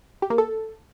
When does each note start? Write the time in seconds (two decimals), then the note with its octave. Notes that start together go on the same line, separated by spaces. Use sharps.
0.22 G4
0.30 A#3
0.38 A4